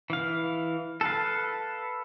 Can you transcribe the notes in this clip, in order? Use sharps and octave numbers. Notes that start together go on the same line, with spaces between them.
E3 F5
A4 B4 F5